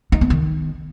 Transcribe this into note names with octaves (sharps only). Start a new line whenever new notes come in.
D#4
B3
D#3